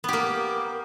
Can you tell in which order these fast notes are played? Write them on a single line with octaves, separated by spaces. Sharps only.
B3 G4 A#3